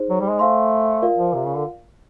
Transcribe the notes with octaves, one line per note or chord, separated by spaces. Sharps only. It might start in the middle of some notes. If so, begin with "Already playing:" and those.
Already playing: D#4 G#4 C5
F#3
G3
G#3
A3 C5 F5 G#5 C6
F4 A#4 D5 F5
F3
C3
C#3
D3